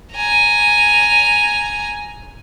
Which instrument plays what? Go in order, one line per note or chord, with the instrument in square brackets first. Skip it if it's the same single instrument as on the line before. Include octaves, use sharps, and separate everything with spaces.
[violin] G#5 A#5